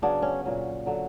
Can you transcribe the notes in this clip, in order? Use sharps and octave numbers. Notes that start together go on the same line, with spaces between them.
C#3 F#3 B3 D4
C#4
A#2 F#3 C#4
D3 F#3